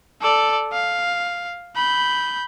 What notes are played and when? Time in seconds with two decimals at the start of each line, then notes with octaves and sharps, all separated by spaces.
0.22 A4 D5
0.72 F5
1.76 B5 G6